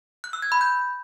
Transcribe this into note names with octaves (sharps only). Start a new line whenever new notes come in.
F#6
E6
G#6
B5
G6